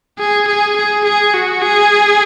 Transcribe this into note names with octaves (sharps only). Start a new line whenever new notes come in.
G#4
G#4
G#4
G#4
F#4
G#4